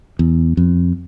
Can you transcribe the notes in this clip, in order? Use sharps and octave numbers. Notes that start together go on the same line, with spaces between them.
E2
F2